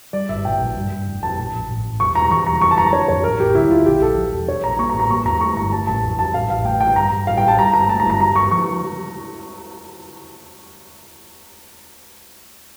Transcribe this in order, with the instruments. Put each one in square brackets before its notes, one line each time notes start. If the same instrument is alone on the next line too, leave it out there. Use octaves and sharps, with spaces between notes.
[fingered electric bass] G3 [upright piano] D5
[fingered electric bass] G1 [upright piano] E5
[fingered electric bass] A#1 [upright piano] G5
[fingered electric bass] A#1
G2
G2
F1
[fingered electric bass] F1 [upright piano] A5
[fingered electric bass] A#1
A#1
A1
A1
[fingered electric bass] E1 [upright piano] C#6
[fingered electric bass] E1 [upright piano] A#5
[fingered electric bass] E3 [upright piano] C#6
[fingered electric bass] E1 [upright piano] A#5
[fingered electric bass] F1 [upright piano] C#6
[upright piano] A5
[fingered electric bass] F1 [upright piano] A#5
[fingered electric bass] D4 [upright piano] C#5
[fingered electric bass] F2 [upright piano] C#5
[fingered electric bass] A1 [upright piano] A#4
[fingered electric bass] A1 [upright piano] G4
[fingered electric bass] D2 [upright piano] E4
[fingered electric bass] D2 [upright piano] F4
[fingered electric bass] A#1 [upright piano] G4
[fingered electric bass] A#1 [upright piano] A4
[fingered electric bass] F3
E1
[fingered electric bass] D4 [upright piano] C#5
[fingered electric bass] A#1 [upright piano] A#5
[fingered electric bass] A#3 [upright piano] C#6
[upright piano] A#5
[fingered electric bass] A1
[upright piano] A#5
[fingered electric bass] A#3 [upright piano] C#6
[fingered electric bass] E2 [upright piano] A#5
[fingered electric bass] A3 [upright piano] C#6
[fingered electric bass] G1 [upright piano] A#5
[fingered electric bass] A3 [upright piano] A5
[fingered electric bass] A1 [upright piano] A5
[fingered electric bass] F2
[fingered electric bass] F2 [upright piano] A5
[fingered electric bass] A1 [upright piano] F5
[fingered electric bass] A1 [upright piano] F5
[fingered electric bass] A3 [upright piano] G5
[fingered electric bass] A#1 [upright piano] G5
[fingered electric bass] G2 [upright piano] A#5
[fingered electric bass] G2
[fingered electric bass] A1 [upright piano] F5
[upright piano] G5
[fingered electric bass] A1
[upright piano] A5
[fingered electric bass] G3 [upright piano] A#5
[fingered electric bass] G1 [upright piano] A#5
[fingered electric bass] A3 [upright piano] A5
[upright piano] A#5
[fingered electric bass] G1
[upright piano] A#5
[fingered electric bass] G2 [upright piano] A#5
[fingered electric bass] G2 [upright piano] C#6
[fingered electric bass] F3 [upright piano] C#6